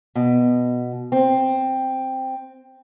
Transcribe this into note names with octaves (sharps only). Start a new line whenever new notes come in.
B2
C4